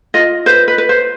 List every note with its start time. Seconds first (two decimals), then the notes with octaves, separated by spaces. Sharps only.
0.14 F4 D#5
0.46 B4 C5
0.68 B4
0.78 B4
0.89 C5